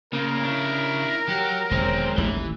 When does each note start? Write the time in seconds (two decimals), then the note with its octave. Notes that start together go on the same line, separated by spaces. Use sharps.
0.13 C#3 A#3 F4 A#4
0.43 D4 E4
1.28 F#3 G4 F#5
1.71 E1 D#3 F#3 G#3 C4
2.18 D#1 A1 D#2 E3